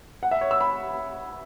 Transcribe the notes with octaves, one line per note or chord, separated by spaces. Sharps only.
F#5
E5
C#5
E6
B5